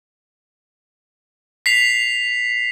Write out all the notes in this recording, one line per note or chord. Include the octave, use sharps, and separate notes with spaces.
B6 C7 F7